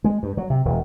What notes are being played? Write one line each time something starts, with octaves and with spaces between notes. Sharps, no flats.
G#3
G2
F#3
C3
E1